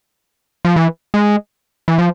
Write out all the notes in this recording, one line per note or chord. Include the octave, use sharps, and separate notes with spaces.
F3
E3
G#3
E3
F3